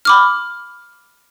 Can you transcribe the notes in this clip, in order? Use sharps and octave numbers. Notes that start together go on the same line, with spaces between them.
B5 D6 F6